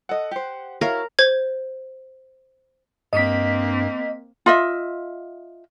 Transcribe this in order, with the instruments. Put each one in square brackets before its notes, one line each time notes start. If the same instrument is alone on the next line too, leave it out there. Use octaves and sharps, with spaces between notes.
[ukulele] A4 D#5 [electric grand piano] F#5
[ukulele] G4 C5
[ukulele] E4 F#4 [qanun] A#4 [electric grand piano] C#5 E5 F5
[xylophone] C5 G#6
[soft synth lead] G2 [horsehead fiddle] A#3 C4 [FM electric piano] D#5 B6
[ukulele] F4 D#5 E5